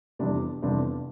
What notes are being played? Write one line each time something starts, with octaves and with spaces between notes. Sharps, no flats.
F1 E2 C3 G3 D4
F1 E2 C3 G3 D4